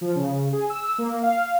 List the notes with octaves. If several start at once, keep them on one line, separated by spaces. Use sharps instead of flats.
F3
C#3
G#4
E6
A#3
F5